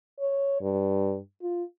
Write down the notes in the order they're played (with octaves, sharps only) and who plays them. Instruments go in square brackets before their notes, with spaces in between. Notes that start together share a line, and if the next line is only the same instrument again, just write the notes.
[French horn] C#5
G2
F4